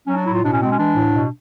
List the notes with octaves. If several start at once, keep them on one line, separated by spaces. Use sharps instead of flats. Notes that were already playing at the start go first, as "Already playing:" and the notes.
F#3 C#4
D4
A2 E4
F4
B2 D4
C#4
G#3 C4
C#4
E3 D4
A2
B2